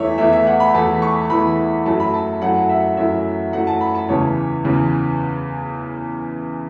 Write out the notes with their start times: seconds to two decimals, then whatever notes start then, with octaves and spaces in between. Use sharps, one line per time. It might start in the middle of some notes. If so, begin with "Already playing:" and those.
Already playing: E2 E3 A3 E4 C#5 E5
0.18 E2 E3 A3 E4 E5
0.33 E5
0.47 F#5
0.60 B5
0.74 E2 E3 A3 E4 A5
1.02 C#6
1.30 E2 E3 A3 E4 B5
1.86 F#2 F#3 A3 E4 A5
2.00 B5
2.14 A5
2.41 F#2 F#3 A3 E4 F#5
2.69 E5
2.97 F#2 F#3 A3 E4 E5
3.53 F#2 F#3 A3 E4 F#5
3.67 A5
3.81 B5
3.95 A5
4.08 E2 C#3 E3 C#5
4.65 E2 C#3 E3